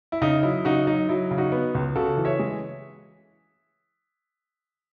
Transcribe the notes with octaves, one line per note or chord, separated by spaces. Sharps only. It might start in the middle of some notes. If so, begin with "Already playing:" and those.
E4
C#3 D#4
F#3 E4
C#3 D#4 F#4
F#3 D#4
F#3 E4
C#3
D#4 F#4
B3
C#2
C#3 F#4 A4
E3
C#5 E5
G#3